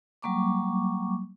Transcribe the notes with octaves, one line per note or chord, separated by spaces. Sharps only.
F#3 G3 A#3 C#6 D6